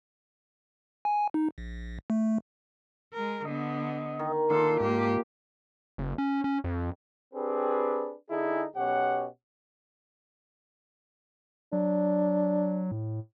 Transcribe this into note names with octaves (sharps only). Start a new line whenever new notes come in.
G#5
D#4
A#1
A3
G#3 A#4
D3 B3 D#5
D#3
A#2 D3 D#3 A4 C6
G#2 A#3 G4
F#1
C#4
C#4
F2
C4 D4 G4 G#4 B4
D3 D#4 E4 G#4
B1 B2 C#4 G4 C#5 F#5
F#3 D4
A2